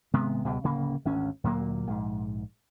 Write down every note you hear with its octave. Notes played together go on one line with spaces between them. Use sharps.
G#1 C3 G#3 B3
C#2 B2 G3
D1 C#3 A#3
G#1 D2 C#4
D2 A#2 F#3 A#3
A#1 G#2